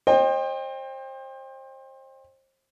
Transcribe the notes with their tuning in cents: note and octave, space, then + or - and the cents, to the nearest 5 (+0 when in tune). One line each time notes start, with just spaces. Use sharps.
C5 +30 D#5 -30 G5 +25